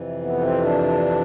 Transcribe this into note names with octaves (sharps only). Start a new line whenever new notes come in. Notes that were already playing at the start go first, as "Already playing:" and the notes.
Already playing: F2 C3 E3
B3
C4
D4